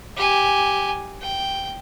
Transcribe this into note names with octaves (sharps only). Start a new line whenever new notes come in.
G4 G#5
G5